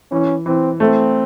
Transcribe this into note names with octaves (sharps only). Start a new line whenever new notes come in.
E3 C#4
E3 C4
A3 C4